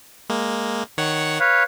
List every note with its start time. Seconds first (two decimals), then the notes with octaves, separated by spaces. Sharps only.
0.29 G#3 A#3
0.98 D#3 C#5 F#5
1.40 B4 C#5 F5